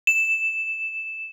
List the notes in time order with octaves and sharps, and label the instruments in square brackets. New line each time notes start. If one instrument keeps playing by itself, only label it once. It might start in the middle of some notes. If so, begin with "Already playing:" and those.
[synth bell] E7